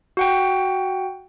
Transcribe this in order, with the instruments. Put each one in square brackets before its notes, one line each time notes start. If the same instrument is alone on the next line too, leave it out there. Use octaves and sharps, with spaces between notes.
[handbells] F#4 F#5 G5